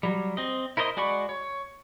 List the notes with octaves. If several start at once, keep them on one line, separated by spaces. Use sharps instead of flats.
F#3 G3
C4 D#5
E4 A#4 C5 D5 D#5
G#3 F#4 D5 B5 C#6
C#5